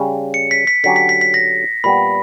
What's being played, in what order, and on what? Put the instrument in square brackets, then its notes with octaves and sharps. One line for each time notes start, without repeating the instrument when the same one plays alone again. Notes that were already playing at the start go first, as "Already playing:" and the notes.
Already playing: [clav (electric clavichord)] C#3 G3 C#4
[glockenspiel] C#7
B6
B6
[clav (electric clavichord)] D3 F#3 C#4 G4 [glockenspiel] B6
[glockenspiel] B6
B6
B6
A#6
[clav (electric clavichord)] A#2 G3 B3 [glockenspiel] B5